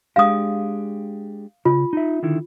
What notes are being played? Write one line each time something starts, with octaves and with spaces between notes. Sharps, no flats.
G#3 D4 G4 F5 D#6
C#3 F4
D#4 E5
D3 D#3 E4